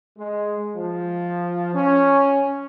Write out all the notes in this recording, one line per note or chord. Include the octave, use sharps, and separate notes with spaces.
G#3
F3
C#4